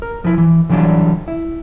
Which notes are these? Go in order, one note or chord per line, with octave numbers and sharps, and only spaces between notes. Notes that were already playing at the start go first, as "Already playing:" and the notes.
A#4
F3 E4
E3
D3 E3 F#3 G3 D4 F4
E4